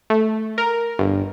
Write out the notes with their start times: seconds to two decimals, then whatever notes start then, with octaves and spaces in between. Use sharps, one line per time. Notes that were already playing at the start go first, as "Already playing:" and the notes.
0.10 A3
0.58 A#4
0.99 G1